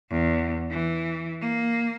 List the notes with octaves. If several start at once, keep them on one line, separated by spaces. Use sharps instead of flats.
E2
E3
A#3